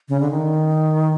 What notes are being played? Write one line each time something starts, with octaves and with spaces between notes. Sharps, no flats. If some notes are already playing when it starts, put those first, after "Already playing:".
C#3
D3
D#3